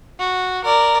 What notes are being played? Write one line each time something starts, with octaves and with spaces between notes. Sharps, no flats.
F#4
A#4 D5